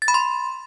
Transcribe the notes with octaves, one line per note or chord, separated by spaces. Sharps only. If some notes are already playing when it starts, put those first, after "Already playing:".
A6
B5
C6